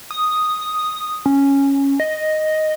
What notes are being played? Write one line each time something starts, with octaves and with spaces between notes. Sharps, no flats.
D#6
C#4
D#5